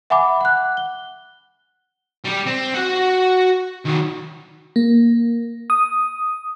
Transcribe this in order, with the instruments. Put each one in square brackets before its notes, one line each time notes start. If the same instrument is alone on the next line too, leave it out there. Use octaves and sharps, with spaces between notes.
[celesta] E5 F#5 G#5 B5 D6
F#5 F#6
G7
[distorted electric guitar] G3 G4
C4
F#4 F#5
D#3 F#3
[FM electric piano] A#3
D#6